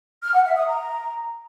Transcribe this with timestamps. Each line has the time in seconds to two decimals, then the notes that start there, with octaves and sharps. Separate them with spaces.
0.23 F6
0.34 F#5
0.45 E5
0.56 D#6
0.67 A#5